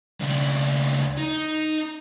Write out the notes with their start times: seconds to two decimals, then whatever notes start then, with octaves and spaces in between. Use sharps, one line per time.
0.20 C#2 D4
1.17 D#4